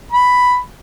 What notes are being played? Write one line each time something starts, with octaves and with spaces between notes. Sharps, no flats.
B5